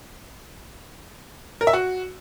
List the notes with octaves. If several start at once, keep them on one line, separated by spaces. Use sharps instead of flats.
A#4
E5
F#4